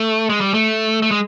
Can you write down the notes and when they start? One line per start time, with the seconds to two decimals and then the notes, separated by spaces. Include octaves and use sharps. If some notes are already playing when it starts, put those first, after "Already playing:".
Already playing: A3
0.30 G#3
0.41 G3
0.54 A3
1.02 A3
1.11 G#3